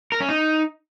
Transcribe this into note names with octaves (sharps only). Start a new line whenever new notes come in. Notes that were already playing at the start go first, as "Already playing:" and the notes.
A#4
C#4
D#4